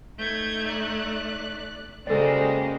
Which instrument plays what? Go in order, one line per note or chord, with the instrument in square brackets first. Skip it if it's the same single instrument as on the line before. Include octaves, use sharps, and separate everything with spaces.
[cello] A3 D#4 [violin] G6 G#6
[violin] D5 F#6
[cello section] C#3 G#3 [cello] A#3 F#4 [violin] G4 C5 [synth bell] A4 D5